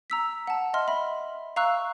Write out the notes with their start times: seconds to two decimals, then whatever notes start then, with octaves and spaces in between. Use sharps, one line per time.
0.10 A#5 E6 B6
0.47 F#5 A5
0.74 D#5 E5 C6 F6
0.88 E5 B5
1.56 F5 A#5 C#6 E6 F#6